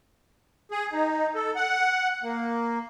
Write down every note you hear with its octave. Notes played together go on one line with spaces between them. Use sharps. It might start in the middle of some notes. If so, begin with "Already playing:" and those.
G#4
D#4
A4
F#5
A#3